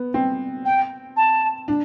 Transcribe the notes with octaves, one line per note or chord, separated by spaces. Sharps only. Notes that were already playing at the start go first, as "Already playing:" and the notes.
Already playing: B3
C4
G5
A5
D4